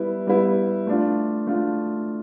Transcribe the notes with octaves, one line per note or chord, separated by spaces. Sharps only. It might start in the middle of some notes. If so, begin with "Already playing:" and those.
Already playing: G3 B3 E4 B4
G3 B3 E4 B4
A3 D4 F4
A3 D4 F4